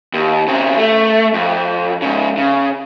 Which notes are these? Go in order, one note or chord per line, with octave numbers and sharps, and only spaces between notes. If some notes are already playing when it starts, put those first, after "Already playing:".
D#2
C#3 C4
A3
F2
G#2 C#3
C#3